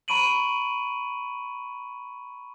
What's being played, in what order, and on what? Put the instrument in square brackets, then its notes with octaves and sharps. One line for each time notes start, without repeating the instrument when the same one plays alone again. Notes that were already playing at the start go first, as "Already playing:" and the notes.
[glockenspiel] A#5 B5 C#6 D7 D#7 F#7